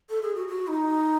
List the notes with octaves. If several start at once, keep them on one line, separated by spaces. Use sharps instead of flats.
A4
G#4
F#4
F#4
D#4